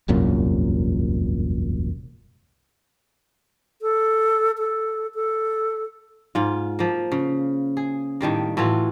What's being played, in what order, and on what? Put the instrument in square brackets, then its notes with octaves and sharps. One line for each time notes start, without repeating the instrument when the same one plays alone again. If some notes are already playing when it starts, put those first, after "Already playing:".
[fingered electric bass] E1 C2 F#2 A#2
[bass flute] A4
A4
A4
[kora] G#2 F4
F3 A#3
C#3
G#4
A2 D#3 G3 A#3
A2 E3 F4 F#4